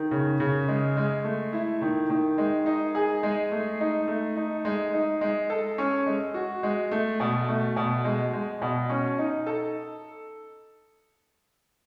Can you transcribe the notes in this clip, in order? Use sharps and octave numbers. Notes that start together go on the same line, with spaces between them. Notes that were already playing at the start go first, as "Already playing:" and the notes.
Already playing: D#3
C#3
C#3
G#3
G#3
A3
E4
D#3
D#3
G#3
D#4
G#4
G#3
A3
D#4
A3
D#4
G#3
D#4
G#3
A4
C#4
G#3
F#4
G#3
A3
B2
A3
B2
G#3
G#3
B2
C#4
D#4
A4